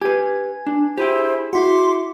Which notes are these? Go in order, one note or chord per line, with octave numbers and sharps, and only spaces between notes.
G4 B4 G#5
D4
E4 G4 G#4 C5 G5 B5
E4 F#4 C6 D6